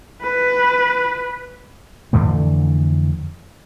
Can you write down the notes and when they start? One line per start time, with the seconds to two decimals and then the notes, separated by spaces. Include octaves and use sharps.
0.22 B4
2.13 F2 D3 E3 A3